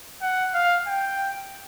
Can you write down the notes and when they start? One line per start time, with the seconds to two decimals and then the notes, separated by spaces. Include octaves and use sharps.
0.22 F#5
0.54 F5
0.88 G5